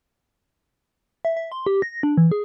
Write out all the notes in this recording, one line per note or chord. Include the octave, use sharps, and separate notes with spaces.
E5
E5
C6
G4
A#6
D4
E3
G#4